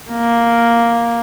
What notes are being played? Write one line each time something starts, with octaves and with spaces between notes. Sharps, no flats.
A#3